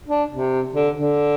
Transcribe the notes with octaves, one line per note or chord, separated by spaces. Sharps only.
D4
C3
D3
D3